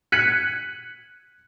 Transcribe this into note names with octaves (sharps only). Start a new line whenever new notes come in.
F#6 G#6 B6 C#7 D#7 F#7